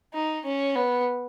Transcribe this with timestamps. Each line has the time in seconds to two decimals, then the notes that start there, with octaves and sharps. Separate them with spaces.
0.14 D#4
0.44 C#4
0.75 B3